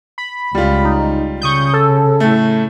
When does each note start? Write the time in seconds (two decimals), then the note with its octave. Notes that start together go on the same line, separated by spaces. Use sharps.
0.18 B5
0.55 C#2 G3 F4
0.85 D#4
1.41 C#3 C#6 D#6 G6
1.74 A4
2.20 A2 A3